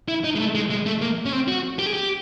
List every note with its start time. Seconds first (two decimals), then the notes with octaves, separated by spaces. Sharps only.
0.08 E4
0.24 D#4
0.35 G#3
0.39 A3
0.55 G#3
0.70 G#3
0.86 A3
1.01 A#3
1.26 C#4
1.33 C4
1.48 F#4
1.79 G4
1.86 G#4
1.94 G4